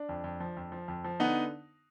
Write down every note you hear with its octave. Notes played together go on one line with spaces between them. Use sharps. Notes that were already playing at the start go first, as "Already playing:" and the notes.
Already playing: D4
F2
F2
F3
F2
F3
F2
F3
D3 B3 D#4